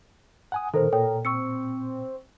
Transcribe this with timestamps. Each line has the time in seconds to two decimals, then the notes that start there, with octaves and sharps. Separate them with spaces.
0.52 F#5 G#5 D#6
0.74 A#2 D#3 A4 A#4 C5
0.92 A#2 A4 C#5 G5
1.25 C4 C#6 E6 C#7